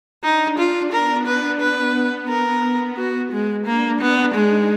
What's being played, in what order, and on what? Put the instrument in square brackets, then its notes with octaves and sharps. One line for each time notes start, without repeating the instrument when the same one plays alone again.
[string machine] D4 [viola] D#4
[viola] F4
[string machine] B3 [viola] A#4
[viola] B4
B4
A#4
F#4
G#3
[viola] A#3 [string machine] D4
[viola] B3
[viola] G#3 [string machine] D#4